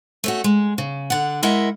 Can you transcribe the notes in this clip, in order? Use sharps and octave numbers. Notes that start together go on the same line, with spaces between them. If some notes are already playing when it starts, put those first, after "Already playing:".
A3 C#4 F#4
G#3
C#3
D3 F#5
G#3 E4 A#4 D#5 E5 F#5